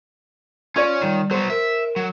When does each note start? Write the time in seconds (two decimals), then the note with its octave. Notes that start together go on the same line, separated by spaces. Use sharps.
0.76 C#4 F4 C#5 D5
1.02 D#3 G3
1.31 F#3 B3 C5
1.50 A#4 E5
1.96 F#3